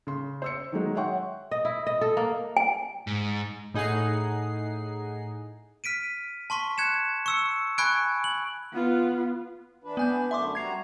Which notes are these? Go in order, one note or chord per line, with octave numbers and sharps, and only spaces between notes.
C#3 C6
C5 E6 C#7
D#3 F#3 G#3 D#4
C#5 E5 F#5 G5 C6 C#6
D#5
E4
D#5
A4
A#3
G#5
G#2
A2 D#4 G#4 F#5 C7
F6 B6 D7 D#7
A5 C6 C#6 B6
F#6 G#6 C#7 E7
C#6 E6 C#7
G#5 B5 C#6 F#6 G#6 D7
F#7
B3 F4
E3 D4 B4
B3 G#5 G6
F#2 D3 A3 E5 C6 D6
G3 F#4 A#5 G#6 C7